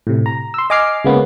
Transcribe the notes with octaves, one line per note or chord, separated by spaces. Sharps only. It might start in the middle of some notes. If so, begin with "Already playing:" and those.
A2 C3
A#5
C6 E6
D#5 G#5 D6 F6 C7
C#3 G#3 A#3 B3 C#4